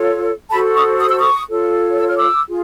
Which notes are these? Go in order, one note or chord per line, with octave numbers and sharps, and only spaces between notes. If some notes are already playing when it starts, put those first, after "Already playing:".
Already playing: F4 A4 C#5
F#4 A4 C5 A5 B5
C#6 D#6
D#6
E6
C#6 D#6
F4 A4 C#5
E6
F6
D6 E6
F4 G#4